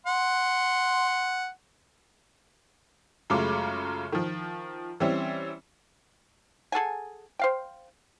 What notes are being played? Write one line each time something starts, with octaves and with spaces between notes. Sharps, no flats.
F#5 C6
F#2 C#3 G#3 A3 F4 D6
D#3 F3
E3 G3 C4 C#4
G#4 A4 F#5 G#5
C5 F5 G5